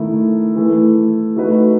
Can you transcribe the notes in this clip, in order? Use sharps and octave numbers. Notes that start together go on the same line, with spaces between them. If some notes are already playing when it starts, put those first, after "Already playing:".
Already playing: D#3 A3 E4
E3 A3 E4
A3 D#4 F#4 B4